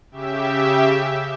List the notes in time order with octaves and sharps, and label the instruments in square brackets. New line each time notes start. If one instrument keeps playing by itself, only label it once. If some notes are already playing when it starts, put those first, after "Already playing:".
[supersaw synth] C#3 G4 E5